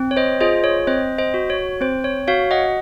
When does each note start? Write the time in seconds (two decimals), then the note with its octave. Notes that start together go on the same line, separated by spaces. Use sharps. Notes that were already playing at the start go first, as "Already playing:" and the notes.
Already playing: C4
0.11 C#5
0.17 C5 D#5
0.41 F4 G#4 C5 D#5
0.64 C#5
0.87 C4 C5 D#5
1.18 C5 D#5
1.34 F#4
1.50 C#5
1.81 C4 C5
2.04 C#5
2.28 F#4 C#5 F5
2.51 D#5 F#5